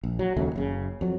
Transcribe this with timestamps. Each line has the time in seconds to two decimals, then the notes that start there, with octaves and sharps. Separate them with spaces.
0.04 A#1
0.19 F#3
0.36 D#2 C#3 F#3 A3
0.56 F#1 C#3
1.01 F2 F#3